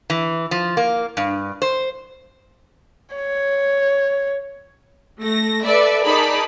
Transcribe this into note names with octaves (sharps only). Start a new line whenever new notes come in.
E3
F3
A#3
G2
C5
C#5
A3 A#6
A4 B4 D5 E5
D#4 G#4 A#4 D5 A5 B5